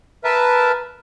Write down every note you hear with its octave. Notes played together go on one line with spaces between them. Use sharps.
A#4 B4 E5 A5